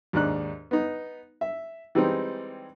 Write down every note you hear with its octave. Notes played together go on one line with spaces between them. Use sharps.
D#2 G#2 D4 F#6
B3 D#4
E5
E3 G3 G#3 C4 D#4